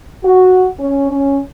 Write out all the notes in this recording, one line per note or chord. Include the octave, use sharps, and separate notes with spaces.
F#4
C#4
C#4